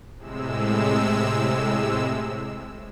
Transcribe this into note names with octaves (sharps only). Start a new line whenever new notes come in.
A2 C3 G#3 E6